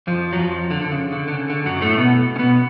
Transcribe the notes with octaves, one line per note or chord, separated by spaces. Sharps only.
F2 F3
F#3
F2 F3
D3
D3
C#3
D3
D3
C#3
D3
F#2 F#3
A2 A3
B2 B3
C#4
B2 B3